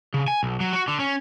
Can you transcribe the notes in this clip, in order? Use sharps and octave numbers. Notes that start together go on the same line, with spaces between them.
C#3
G#5
B1
F#3
F#4
D3
C#4